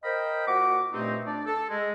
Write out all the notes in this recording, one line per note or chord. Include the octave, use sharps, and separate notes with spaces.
A#4 C5 D#5 F5 G5 B5
A#2 F#4 F#5 D6
G2 A#2 A3 C4 D#4
D4 D5
A4
G#3